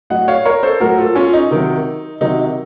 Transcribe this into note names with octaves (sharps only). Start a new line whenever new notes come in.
A2 F#3 D#5 F#5
C#5 F5
A#4 C#5
A4 C5
A2 F#3 F#4 A#4
F4 A4
C#4 F4
D#4
C3 D#3 F#3
C3 D#3 F#3 D#4